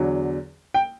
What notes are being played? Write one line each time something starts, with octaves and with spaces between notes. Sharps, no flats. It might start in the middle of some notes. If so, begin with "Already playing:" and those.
Already playing: E2 D3 F#3
G5